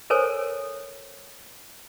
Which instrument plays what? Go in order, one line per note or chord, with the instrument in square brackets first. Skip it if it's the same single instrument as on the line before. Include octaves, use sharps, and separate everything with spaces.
[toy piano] A4 A#4 C5 C#5 G#5